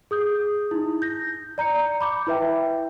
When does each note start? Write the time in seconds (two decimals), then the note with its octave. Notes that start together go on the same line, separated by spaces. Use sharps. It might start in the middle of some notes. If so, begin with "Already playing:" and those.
0.11 G#4 D#6 G6
0.71 D#4 E4
1.02 G6 A#6
1.58 D5 A#5 G6 C#7
2.01 B5 D6 G6
2.27 E4 B4 E5 G5